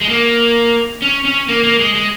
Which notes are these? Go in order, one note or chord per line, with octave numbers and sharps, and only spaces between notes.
G#3
A#3
C#4
C#4
A#3
A#3
G#3
G#3